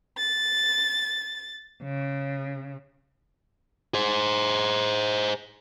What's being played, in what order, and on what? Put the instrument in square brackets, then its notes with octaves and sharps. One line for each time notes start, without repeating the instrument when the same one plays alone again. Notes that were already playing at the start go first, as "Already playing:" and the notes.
[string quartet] A6
C#3
[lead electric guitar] G#4 C5